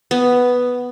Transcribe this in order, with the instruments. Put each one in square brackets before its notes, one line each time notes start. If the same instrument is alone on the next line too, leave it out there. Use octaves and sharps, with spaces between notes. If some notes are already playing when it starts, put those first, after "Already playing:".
[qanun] B3